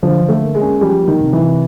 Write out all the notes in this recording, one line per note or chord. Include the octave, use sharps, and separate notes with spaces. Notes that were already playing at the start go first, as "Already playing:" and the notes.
D3 F3
D3
A3
A#3
G#3
C#4
F3 G3
A#3
D#3
C3
E3
C3